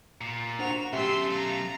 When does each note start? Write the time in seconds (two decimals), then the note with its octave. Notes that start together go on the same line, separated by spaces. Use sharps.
0.21 A#2
0.59 D4 F#4 C5 F#5 F7
0.93 B1 A3 C#4 G4 E5 C6 E6
1.29 F5 A#5